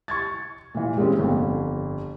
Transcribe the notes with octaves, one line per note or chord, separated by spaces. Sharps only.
C#6 G#6 A6
A#2 E3
G3 G#3 A#3 C4 C#4
G1 F2